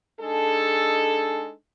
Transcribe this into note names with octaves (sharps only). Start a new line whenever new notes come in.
G#3 D4 D#4 G#4 A4